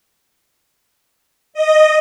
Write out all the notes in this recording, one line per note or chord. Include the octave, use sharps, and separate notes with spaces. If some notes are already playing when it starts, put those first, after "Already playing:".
D#5